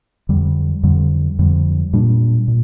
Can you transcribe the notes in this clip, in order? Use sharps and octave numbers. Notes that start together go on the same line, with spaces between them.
F2 D3 G3
F2 D3 G3
F2 D3 G3
A#2 G3 D4
A#2